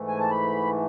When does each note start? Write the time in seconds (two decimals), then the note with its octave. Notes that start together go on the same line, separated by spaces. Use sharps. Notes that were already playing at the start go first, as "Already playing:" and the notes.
Already playing: G#2 E3 A3
0.08 G#5
0.19 A5
0.30 B5